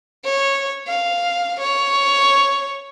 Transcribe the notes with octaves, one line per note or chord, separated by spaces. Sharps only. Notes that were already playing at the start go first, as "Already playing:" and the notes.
C#5
F5
C#5